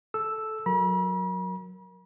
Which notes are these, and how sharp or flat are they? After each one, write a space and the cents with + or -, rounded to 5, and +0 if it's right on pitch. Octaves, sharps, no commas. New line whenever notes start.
A4 -10 E6 +0
F#3 -15 A#4 +0 B5 -45